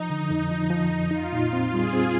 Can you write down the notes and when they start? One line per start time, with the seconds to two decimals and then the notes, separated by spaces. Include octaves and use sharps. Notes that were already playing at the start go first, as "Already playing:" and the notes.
Already playing: F3 D#4
0.10 D3
0.30 F2
0.50 F3
0.70 F3
0.91 F2
1.11 D#4 F4
1.33 A#2
1.53 C4
1.73 G3 G#4
1.93 C4